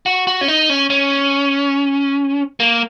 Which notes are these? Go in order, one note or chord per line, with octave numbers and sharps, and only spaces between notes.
F#4
F#4
C#4
D#4
C#4
C#4
A#3